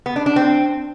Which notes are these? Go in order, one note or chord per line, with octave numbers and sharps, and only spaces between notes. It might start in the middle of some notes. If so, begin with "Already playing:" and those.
B3
D4
D4
C4